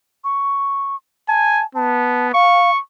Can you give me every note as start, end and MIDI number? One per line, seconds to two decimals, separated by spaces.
0.24 0.96 85
1.28 1.63 80
1.28 1.64 81
1.75 2.29 59
1.75 2.28 81
2.34 2.70 77
2.34 2.79 85